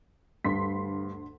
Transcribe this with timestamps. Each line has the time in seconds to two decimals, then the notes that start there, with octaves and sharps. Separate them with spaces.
0.45 D2 G2 C6 B6